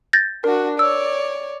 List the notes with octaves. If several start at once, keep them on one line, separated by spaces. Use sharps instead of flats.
G6 A6 A#6
D4 F#4 A#4
C#5 D5 E6